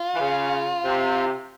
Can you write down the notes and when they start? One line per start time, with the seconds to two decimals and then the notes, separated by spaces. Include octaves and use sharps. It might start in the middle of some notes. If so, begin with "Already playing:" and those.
Already playing: F4
0.14 E3
0.20 C#3
0.85 C3